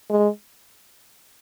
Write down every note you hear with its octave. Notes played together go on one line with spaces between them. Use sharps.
G#3